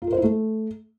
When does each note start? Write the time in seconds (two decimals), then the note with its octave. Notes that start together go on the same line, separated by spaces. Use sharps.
0.02 F4
0.07 A#4
0.13 C5
0.18 E4
0.23 A3